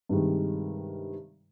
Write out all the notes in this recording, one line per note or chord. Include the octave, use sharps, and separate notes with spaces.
G2 C3 D#3 G#3